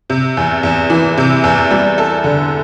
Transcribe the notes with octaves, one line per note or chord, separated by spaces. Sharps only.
C3
E2
E2
E3
C3
E2
G3
A4
D3